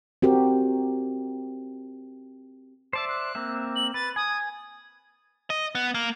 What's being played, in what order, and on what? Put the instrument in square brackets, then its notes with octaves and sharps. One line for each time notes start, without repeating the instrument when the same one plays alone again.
[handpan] C4 F#4 G4 A#4
[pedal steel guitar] C5 D5 E5 [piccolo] A5
[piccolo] F#6
[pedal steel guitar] A#3 C4 E5
[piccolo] F#7
[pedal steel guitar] B4 [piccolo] A6
[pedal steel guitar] G#5 [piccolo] D#6
[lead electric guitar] D#5
B3
A#3